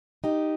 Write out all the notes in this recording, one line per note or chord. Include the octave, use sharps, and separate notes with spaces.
D#4 G4